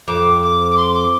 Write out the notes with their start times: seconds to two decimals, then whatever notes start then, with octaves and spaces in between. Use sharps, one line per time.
0.07 F2 D6
0.41 D6
0.71 D6
0.76 C6
0.94 D6